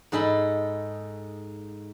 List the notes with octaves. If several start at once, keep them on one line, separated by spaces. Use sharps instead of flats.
G#2 G#4 A4 D#5 B5